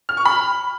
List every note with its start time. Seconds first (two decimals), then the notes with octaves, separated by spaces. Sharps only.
0.09 F6
0.17 C#6
0.25 B5